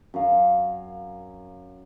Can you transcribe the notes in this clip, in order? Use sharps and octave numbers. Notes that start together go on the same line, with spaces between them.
F#2 F5